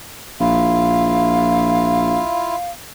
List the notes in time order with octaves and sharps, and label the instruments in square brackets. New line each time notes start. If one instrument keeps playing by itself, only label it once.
[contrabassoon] A#1 [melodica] E4 F4 [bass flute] F5